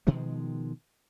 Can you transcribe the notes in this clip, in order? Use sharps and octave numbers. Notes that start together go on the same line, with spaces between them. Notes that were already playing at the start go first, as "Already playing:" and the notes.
B2 D#3 F3 G#3